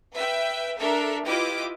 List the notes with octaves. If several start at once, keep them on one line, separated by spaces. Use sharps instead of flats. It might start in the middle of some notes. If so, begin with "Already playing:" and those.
B4 E5 G5
D4 A4 A#4 E5
E4 F4 G4 B4 D#5 D6